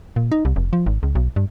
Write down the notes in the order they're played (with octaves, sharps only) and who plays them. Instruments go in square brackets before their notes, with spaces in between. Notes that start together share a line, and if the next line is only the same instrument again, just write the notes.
[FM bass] A#2
D#4
C2
F1
F3
G#1
C#2
B1
G2